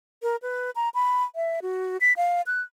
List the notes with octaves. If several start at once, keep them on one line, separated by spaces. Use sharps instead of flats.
A#4
B4
A#5
B5
E5
F#4
B6
F5
F#6